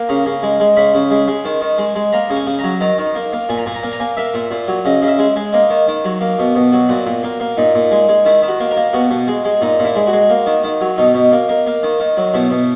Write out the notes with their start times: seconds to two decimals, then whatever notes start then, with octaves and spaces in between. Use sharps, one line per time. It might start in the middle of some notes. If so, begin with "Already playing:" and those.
Already playing: A#3
0.09 C#3 A#5
0.26 C#3
0.43 G#3
0.60 G#3
0.77 C#3 B5
0.94 C#3
1.10 G#3
1.28 G#3
1.45 D#3
1.62 D#3
1.78 G#3
1.95 G#3
2.13 A#3 A#5
2.30 C#3
2.36 G#5
2.47 C#3
2.59 F#3 A#5
2.81 D#3 A#5
2.98 D#3
3.15 A#3
3.33 A#3
3.49 A#2 G#5
3.58 A#5
3.66 A#2 G#5
3.74 A#5
3.83 A#3 G#5
3.92 A#5
4.00 A#3 G#5
4.17 A#3 E5
4.34 A#2
4.51 A#2
4.68 F#3
4.85 C#3 D#5
5.02 C#3 D#5
5.08 E5
5.19 G#3
5.36 G#3
5.53 A#3 D#5
5.70 D#3
5.88 D#3
6.05 F#3
6.21 A#3
6.39 B2
6.55 B2
6.73 F#3
6.89 A#2 F#4
7.06 A#2
7.23 A#3
7.40 A#3
7.57 A#2 D#4
7.75 A#2
7.91 G#3
8.09 G#3
8.25 D#3 E4
8.43 D#3
8.48 F#4
8.60 A#3
8.71 A#4
8.77 A#3
8.93 B2 F#4
9.10 B2
9.28 G#3
9.45 G#3
9.61 A#2 D#4
9.79 A#2
9.85 E4
9.96 G#3
10.07 F#4
10.13 G#3
10.30 A#3
10.46 D#3
10.64 D#3
10.81 F#3
10.98 B2 D#4
11.14 B2
11.32 A#3
11.49 A#3
11.67 A#3
11.83 D#3
12.00 D#3
12.17 F#3
12.34 B2 E4
12.51 B2